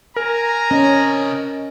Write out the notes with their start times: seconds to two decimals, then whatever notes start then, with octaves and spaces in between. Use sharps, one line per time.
0.16 A#4 G#5 A#5
0.71 C3 C#4 D#5